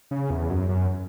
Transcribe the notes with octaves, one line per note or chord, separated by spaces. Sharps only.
C#3
E2
F#2
F#2